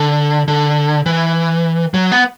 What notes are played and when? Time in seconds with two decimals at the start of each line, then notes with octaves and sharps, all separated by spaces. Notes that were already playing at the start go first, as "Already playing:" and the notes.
Already playing: D3
0.48 D3
1.06 E3
1.94 F#3
2.12 B3